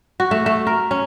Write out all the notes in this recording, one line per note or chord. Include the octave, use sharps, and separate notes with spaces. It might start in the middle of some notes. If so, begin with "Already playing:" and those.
F#4
A3
A3
A#4
C#4